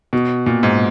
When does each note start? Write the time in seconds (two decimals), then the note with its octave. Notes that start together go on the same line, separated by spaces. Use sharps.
0.13 B2
0.46 A#2
0.63 G#2